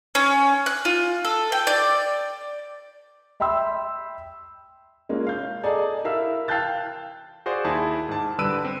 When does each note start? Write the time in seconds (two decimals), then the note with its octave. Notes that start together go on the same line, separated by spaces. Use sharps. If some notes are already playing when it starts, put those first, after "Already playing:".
0.15 C#4
0.66 F#6
0.85 F4
1.25 A4
1.52 G5
1.67 D5
3.40 E5 G5 B5 C6 E6
5.09 G#3 A#3 C#4 F4
5.27 F5 G6
5.64 G#4 A4 D5 D#5 G#5 A#5
6.04 E4 A#4 E5 F5 E6
6.48 F5 G5 A5 F#6 G6 A6
7.46 F#4 G#4 C5 D5 F5
7.65 D#2 E4 G#4 A5
8.09 G#2 A5
8.39 D3 G3 B4 E6 D7 D#7
8.65 C4